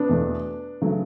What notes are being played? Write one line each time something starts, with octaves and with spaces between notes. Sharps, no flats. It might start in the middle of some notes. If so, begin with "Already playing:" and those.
Already playing: B3 D4
E2 B2 A3
C#3 F#3 A3